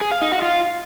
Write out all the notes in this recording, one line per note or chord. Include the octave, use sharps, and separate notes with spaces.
G#4
F5
D#4
F#4
F4